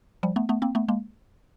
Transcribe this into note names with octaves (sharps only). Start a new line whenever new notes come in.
F3 G3
A3 B3
A3 B3
A#3 C4
A3 B3
G#3 A#3